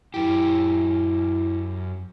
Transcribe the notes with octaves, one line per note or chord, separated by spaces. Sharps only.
F#2 E4 G4